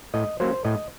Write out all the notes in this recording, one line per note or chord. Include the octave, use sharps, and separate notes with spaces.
A2 D#5
F#3 A#3 C#4 C5
A2 D#5